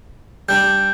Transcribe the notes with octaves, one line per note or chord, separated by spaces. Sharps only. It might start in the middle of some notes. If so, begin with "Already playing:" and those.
G3 D4 G6